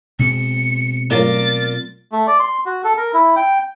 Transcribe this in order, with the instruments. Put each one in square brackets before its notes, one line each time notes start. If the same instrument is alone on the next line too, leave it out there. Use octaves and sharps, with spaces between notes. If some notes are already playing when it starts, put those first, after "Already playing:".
[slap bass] B2 G#3 C4 [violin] C#7
[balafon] F#3 A3 C#5 [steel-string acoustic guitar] F4 A#4 D5 [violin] A6
[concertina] A3
D5
C6
F#4
A4
A#4
E4
G5